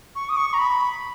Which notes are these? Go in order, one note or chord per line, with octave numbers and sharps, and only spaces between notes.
C#6
D#6
C#6
A#5
B5